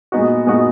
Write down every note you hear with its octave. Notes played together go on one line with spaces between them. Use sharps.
A#2 G#3 B3 D#4 F#4
A#2 G#3 B3 D#4 F#4